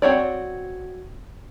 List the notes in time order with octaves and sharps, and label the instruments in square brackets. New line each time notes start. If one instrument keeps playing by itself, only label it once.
[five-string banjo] C4 F#4 C#5 D5